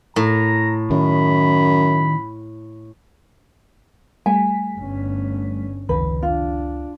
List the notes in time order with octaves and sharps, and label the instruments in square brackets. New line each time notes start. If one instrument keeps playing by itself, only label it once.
[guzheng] A2 [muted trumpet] A#5
[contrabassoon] F#2 [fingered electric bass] D#3 [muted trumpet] B5
[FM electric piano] G3 A3 B6 [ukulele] G#5
[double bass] G1 C#4
[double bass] F1 [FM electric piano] C#2 D#3 [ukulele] B4
[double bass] D4 [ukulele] F4